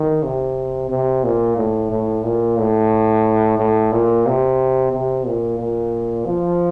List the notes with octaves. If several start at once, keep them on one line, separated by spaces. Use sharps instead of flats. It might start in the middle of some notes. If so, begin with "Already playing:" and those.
Already playing: D#3
C3
C3
A#2
A2
A2
A#2
A2
A2
A#2
C3
C3
A#2
A#2
F3